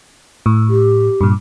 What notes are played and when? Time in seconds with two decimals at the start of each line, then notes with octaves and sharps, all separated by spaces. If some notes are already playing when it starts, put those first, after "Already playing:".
0.46 A2
0.70 G4
1.21 G2 A#2